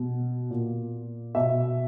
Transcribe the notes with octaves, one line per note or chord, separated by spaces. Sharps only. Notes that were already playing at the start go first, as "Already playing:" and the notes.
Already playing: B2
A#2
B2 E5